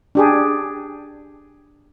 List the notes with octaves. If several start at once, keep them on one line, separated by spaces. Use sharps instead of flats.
D4 G4 G#4